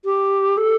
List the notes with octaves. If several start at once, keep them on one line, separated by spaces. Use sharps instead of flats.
G4
A4